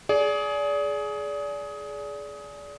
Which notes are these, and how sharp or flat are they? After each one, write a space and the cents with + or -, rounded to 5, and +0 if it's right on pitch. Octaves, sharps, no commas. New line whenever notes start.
G#4 +20 D5 -25